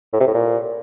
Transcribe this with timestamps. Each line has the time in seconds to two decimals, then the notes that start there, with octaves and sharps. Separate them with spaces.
0.13 A2
0.20 C3
0.27 A2
0.34 A#2